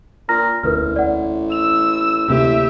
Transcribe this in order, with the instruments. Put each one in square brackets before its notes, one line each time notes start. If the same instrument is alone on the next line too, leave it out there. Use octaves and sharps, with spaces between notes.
[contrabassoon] A#2 [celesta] A#5 F6 A#6
[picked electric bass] E1 D2 [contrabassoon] A1 [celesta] A#4 B4 F6
[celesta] D5 F#5
[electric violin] E6 [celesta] F7
[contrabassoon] A1 [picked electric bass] D2 C3 A#3 [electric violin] G4 E5